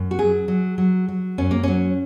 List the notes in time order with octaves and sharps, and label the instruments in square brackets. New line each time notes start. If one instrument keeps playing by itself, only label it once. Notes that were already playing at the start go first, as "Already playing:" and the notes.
Already playing: [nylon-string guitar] F#2
F#4
F#3 G#4
F#3
F#3
F#3
F#2 C#4
A#3
F#3 C#4